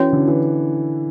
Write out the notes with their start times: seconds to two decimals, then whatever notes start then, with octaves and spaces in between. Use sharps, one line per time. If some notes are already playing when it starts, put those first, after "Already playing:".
Already playing: E3 C#4 F#4 C#5
0.13 D3
0.27 E3